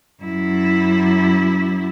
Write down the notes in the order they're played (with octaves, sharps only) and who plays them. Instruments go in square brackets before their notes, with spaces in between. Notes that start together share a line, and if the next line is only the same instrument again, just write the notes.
[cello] F#2 E4